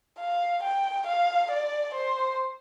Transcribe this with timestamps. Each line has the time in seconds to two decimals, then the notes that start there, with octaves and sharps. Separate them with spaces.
0.20 F5
0.63 G5
1.07 F5
1.51 D5
1.95 C5